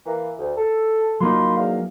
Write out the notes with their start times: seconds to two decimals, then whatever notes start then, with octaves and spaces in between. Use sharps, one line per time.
0.05 E3 A#3
0.38 D2
0.57 A4
1.21 F#3 A#3 D#4 F4 B5 C6
1.55 E2 F5